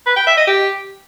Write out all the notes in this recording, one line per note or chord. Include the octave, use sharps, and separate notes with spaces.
B4
G5
E5
D#5
G4